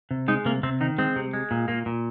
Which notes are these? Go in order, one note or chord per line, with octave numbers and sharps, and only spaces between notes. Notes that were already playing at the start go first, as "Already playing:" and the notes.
C3
G#3 D#4
C3 A#3
C3 C4
D#3 D#4
G#3 C4
C3
G#3
A#2
A#2 A#3
A#2